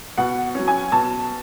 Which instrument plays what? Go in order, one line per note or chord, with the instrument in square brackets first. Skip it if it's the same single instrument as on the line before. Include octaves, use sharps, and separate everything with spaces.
[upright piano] B2 F#5
F#3 C#4
G#5
B2 A5